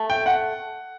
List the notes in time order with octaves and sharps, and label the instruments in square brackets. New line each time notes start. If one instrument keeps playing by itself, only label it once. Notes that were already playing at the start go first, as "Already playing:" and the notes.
Already playing: [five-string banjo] A3
[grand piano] G5
F#5